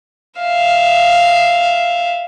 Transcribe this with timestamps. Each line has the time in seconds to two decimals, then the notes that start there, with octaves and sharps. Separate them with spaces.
0.41 E5 F5